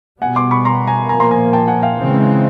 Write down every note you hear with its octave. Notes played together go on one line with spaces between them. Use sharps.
B2 G3 B3 F#5 G#5
C6 D6
B5 C#6
A#5 C6
G#5 A#5
A#2 F3 A#3 G#5 A#5
A#5 C6
G#5 A#5
G5 A5
F#5 G#5
F5 G5
C#3 E3 G#3 C4